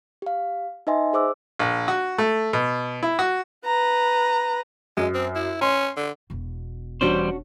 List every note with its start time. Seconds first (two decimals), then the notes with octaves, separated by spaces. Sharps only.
0.22 G4 F5
0.87 D#4 B4 D#5 E5 G#5 C6
1.13 G#4 C5 D6 E6
1.59 A#1
1.88 F#4
2.18 A3
2.53 B2
3.03 E4
3.19 F#4
3.65 B4 A#5
4.97 F#2 G#3
5.14 C4
5.35 E4
5.61 C#4 C6
5.97 D3
6.30 E1 B2
7.01 E2 G3 C#4 D4 F#4 C5